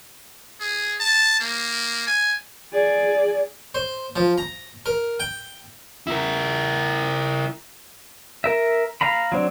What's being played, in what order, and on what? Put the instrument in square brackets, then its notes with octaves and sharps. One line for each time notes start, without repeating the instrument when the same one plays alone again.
[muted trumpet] G#4
A5
A#3
G#5
[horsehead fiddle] G#4 D5
[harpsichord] C5
F3
A#5
A#4
G5
[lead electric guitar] E4 A#4
[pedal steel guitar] A#4 E5
F5 A#5 B5
F#3 C4 D4